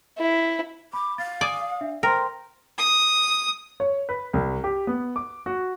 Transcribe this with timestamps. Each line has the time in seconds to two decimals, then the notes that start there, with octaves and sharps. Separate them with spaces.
0.18 E4
0.93 B5 D6
1.18 F5 A6
1.41 D5 G#5 D#6
1.81 D4 E5
2.03 A#4 C5 G5 C6
2.78 D#6
3.80 C#5
4.09 B4
4.33 C2
4.64 G4
4.87 B3
5.16 D6
5.46 F#4